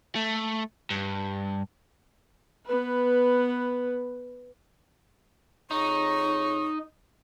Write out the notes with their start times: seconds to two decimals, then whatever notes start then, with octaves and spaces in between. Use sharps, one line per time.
0.15 A3
0.90 G2
2.66 B3 B4
5.71 F2 D#4 G#4 C#5 C#6